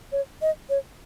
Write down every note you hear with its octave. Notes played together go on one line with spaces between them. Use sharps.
C#5
D#5
C#5